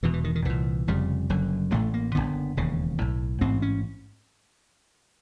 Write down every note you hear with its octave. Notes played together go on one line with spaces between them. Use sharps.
E1 E2 B2 E3
E3
D#3
D#3
C2 A#2 E3
F1 F2 C#3 G3
F#1 F#2 D3
A1 A2 A3
A#3
F#1 F#2 D3 B3
E1 D#2 C#3
B1 A2
A1 G#2 C4
C#4